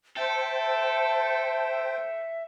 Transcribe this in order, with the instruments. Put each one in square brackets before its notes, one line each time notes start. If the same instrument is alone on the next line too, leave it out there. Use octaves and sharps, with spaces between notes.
[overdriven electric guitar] A4 [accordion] C5 G5 [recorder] E5 [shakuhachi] A5